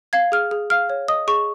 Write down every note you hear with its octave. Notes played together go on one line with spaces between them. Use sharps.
F5 G#6
G#4 F6
G#4
F5 F6
C#5
D#5 D#6
G#4 C#6